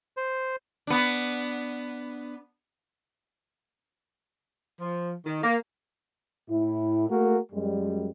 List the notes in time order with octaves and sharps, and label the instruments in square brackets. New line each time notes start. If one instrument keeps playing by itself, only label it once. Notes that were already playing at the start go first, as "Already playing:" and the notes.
[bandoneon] C5
[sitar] B3 D4
[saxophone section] F3
D#3
A#3
[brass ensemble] A2 E4
A3 A#3 F#4 G#4 A#4
F#2 G3 G#3